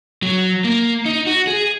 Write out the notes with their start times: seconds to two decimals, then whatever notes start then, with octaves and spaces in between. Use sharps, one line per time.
0.23 F#3
0.64 A#3
1.06 D#4
1.26 F#4
1.47 G#4